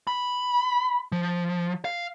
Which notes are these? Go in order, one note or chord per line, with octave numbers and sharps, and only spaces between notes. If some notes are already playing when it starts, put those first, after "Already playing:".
B5
F3
F5